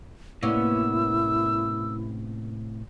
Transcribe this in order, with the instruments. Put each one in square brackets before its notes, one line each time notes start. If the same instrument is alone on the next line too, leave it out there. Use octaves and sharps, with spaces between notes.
[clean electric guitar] A2 C3 [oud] A#3 B3 C#4 [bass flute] E4 [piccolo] E6